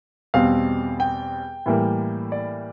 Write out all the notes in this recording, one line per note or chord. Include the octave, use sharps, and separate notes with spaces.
E2 B2 G3 C4 F5
G5
A2 E3 G3 A#3
D5